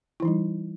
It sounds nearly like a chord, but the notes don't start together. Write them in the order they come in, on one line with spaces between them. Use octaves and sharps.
E4 E3 D#4 G3